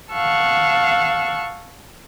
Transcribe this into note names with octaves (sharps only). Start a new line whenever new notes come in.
F5 F#5 A5 C#6 E6